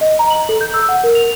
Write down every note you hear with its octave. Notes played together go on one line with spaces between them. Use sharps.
D#5
A#5
F#7
A4
G6
E6
F#5
A#4
F7